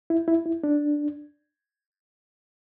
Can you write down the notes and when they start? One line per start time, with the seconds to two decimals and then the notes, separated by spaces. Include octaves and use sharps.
0.10 E4
0.28 E4
0.46 E4
0.64 D4